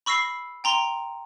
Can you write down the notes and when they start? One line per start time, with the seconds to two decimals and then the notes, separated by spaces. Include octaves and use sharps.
0.06 B5 C#6 E6 A#6 C7
0.64 G5 A#5 C6